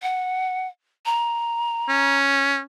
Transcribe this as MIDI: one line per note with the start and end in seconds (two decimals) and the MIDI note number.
0.02 0.67 78
1.06 2.18 82
1.88 2.61 61